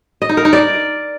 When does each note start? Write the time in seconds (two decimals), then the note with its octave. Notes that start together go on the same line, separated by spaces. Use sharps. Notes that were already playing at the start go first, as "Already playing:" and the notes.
0.22 D#5
0.29 D#4
0.37 A#4
0.45 D#4
0.53 D5